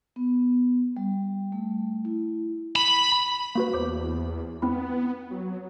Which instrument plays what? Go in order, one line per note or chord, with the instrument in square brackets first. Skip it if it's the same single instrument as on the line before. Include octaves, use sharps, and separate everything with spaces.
[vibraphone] B3
G3
A3
E4
[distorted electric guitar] B5
[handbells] A#3 F#4 B4
[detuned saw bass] E2 [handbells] C5 D6
[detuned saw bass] B3 [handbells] C4 E4 B5
[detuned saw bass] F#3